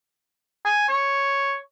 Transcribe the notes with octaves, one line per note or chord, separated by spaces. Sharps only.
G#5
C#5